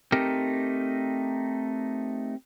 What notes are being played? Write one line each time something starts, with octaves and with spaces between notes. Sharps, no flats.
A3 C4 D#4 G4 A#4